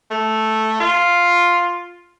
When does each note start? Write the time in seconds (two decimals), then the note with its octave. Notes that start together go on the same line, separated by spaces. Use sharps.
0.10 A3
0.80 F4